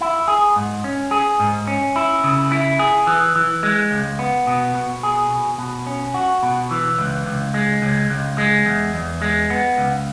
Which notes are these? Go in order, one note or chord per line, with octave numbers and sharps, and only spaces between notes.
E4
G#4
G#2
C#4
G#4
G#2
C#4
E4
C#3
E4
G#4
E3
E3
G#3
C#2
B3
B2
B2
G#4
B2
B2
C#4
F#4
B2
E3
C#2
C#2
G#3
C#2
C#2
G#3
E2
E2
G#3
B3
C#2